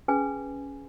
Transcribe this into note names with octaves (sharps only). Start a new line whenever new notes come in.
C#4 G#4 B4 G#5